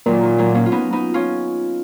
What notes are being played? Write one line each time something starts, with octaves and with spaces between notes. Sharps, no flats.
A#2 D#3 F#3
D#3
F#3 A#3
A#3 C#4
F4
B3 D#4
B3 D#4
C#4 F4